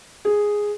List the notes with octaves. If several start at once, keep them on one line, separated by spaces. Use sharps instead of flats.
G#4